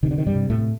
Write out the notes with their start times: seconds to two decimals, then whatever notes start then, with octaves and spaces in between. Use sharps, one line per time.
0.03 C3 D#3
0.11 D3
0.18 D#3
0.26 G2 G3
0.34 C3
0.50 A2 A3